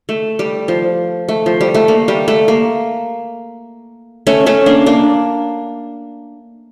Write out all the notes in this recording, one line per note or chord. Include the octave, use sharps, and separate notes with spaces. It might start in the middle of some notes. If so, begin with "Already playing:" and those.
A3
G3
F3
A3
F3
G3
A3
A#3
G3
A3
A#3
A3 C#4
A3 C#4
A#3 D4
A#3 D4